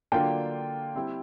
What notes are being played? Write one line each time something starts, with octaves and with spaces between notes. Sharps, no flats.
D3 F#3 A#3 D4 F4 G5
G3 C4 E4